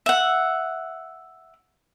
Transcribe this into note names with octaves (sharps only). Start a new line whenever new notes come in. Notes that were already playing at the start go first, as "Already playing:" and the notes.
E5 F#5